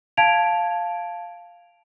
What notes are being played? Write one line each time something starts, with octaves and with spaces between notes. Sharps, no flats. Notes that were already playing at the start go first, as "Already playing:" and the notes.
F5 A5 G#6 D7 F7